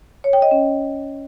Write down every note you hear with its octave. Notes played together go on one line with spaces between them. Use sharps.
C#5
G5
D#5
C#4